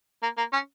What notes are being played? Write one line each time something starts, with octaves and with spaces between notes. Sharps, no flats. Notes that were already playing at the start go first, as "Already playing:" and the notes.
A#3
A#3
C#4